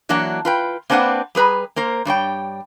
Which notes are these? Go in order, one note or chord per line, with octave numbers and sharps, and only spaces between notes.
E3 F#3 A#3 D4 F#4 F#5
F4 B4 G5
A#3 C4 D4 B4 C5 F#5
G3 G#4 B4 A#5
A#3 A#4 C5
G2 G3 C#5 G5